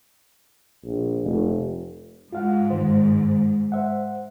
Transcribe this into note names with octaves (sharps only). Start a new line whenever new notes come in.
A#1
F1
G#2 F4 F5 F#5
G2 D#3 C5
C5 E5 F#5